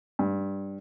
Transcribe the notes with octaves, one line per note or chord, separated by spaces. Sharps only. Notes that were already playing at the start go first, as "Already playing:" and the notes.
G2